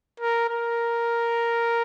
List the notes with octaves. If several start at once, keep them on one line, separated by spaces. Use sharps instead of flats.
A#4
A#4